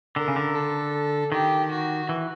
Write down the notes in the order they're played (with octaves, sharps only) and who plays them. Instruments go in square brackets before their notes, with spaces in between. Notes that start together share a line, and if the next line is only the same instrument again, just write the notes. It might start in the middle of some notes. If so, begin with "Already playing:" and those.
[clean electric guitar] D3 [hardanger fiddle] A#4
[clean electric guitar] C#3
D3
[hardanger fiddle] A4
[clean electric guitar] D#3 [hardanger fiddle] G4
[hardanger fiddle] F#4
[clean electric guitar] E3